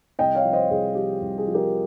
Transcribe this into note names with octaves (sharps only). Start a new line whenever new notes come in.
C2 D#5 G5
C#5 F5
F3
C5 D#5
C2 G#4
F3 G4
C2
G#4
F3
G4 A#4